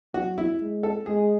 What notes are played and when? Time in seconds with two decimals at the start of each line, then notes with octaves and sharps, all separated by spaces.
0.14 F#3 F#4
0.38 E4
0.61 G#3
0.83 A4
1.06 G#3 G#4